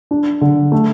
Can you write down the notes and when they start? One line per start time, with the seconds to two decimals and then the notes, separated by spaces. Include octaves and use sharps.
0.11 D4
0.41 D3
0.72 A3